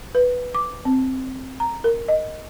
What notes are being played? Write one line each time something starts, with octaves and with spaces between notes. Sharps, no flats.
B4
D6
C4
A#5
A#4
D#5